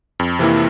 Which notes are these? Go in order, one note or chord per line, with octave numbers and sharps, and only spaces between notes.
F2
C3 E3 A#3 E4